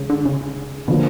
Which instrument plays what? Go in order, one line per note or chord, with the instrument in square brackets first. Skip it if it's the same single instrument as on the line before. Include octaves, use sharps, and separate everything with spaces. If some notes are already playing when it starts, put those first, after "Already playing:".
Already playing: [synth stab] C#3 [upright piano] G#3
[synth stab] D3
C#3
[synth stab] B2 [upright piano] D3 F3 A#3